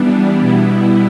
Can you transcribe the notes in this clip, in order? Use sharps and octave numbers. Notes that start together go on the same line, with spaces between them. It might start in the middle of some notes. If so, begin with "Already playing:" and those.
Already playing: E3 G3 B3 D4
B2 G3 B3 E4